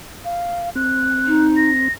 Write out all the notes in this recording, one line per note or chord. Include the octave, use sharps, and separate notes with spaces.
F5
C4 F#6
D#4
A#6